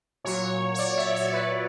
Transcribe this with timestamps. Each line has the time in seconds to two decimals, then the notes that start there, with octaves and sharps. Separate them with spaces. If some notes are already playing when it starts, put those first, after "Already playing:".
0.24 A#2 F#3 C#5
0.74 C#5
0.79 D5
0.97 E5
1.15 D5
1.33 B4